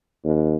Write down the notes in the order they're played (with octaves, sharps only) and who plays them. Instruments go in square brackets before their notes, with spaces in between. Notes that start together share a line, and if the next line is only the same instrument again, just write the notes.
[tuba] D#2